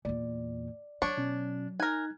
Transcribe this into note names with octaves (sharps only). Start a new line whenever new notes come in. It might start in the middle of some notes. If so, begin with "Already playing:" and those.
E2 A#2 D5
F#3 D4 C#5
B2 C#4
D#4 A#4 G#5 F#6 G#6